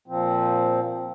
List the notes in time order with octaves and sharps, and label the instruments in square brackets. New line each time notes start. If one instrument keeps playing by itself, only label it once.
[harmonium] A#2 F3 C4